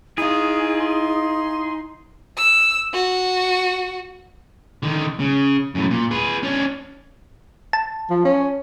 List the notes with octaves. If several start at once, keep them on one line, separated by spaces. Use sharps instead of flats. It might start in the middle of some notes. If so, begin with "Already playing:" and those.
D#4 E4 G#4 F5
C6
E6
F#4
D3 D#3
C#3
F#2 A2
A#2
G#4 B4
C#4 D4
A5
F3
C#4